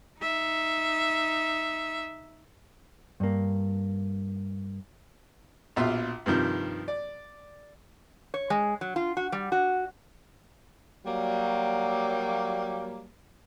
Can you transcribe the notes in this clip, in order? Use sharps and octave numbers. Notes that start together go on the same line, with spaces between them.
D#4 E5
G2 A#3
A#1 B2 F4 E5 C6
G2 C3 D#3 F3
D5
C#5
G#3
F#3
F4
F#4
G3
F#4
F#3 G3 A#3